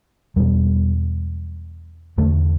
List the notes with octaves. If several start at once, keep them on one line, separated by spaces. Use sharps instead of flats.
E2 B2 G3
E2 D3 A3